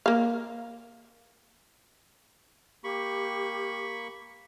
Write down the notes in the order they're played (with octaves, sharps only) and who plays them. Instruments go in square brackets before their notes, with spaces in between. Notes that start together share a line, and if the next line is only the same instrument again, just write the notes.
[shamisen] A#3 F5
[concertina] A#3 B5 C#6 [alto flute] G4